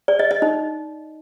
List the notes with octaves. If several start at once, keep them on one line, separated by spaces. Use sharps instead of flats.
D5
D#5
D#5
D#4